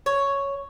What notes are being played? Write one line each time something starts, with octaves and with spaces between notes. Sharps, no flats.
C#5